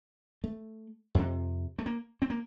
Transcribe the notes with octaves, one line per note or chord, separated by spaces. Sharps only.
A3
F2 C3
A3
A#3
C4
A#3